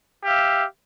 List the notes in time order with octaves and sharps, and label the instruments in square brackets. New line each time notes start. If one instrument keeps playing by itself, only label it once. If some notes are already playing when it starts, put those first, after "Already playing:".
[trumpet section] G4 E5 F5